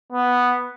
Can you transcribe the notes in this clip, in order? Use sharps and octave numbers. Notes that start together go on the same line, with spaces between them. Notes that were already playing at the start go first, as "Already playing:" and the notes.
B3